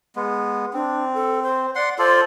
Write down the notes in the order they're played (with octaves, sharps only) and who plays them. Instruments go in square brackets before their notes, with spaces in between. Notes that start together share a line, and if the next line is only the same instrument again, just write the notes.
[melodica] G#3 B3
[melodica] C4 [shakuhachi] D4
[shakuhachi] A4
C5
[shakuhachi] D5 [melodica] F#5 C6
[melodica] F4 A4 D5 [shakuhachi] C5